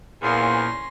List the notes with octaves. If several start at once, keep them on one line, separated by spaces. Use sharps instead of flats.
E2 A#2 F3 C#4 C6 A#6